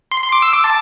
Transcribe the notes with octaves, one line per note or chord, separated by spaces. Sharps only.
C6
D6
E6
D6
A5